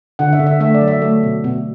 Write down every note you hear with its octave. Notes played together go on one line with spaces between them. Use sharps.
D3 F#5
E5
D3
E5
A3 E5
D5
F#3
E5
A3
B2
B2